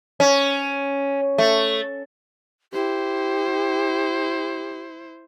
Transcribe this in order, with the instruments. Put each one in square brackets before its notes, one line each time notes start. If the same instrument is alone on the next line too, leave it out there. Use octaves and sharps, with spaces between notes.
[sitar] C#4
A3
[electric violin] E4 C5 [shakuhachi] G4